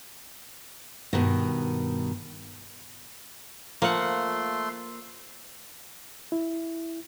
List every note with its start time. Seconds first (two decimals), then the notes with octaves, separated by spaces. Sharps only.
1.13 G2 B2 D#3
3.82 F3 A3 A#3 F#5 C6
6.32 E4